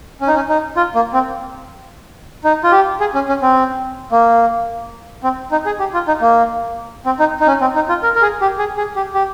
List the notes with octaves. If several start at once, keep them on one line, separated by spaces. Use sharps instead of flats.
C#4
D#4
C#4
D#4
F4
A#3
C4
D#4
F4
G4
G#4
C#4
C#4
C4
A#3
C4
D#4
G#4
G4
F4
D#4
A#3
C4
D#4
D#4
C#4
C4
D#4
F4
A#4
A#4
G#4
G4
G#4
G#4
G4
G4